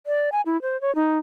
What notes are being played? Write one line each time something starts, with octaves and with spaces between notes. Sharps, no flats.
D5
G#5
E4
C5
C#5
D#4